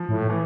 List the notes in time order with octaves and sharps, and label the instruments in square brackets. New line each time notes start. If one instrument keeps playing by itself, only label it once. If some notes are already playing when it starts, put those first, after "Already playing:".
Already playing: [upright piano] F3
[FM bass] A2
[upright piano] E3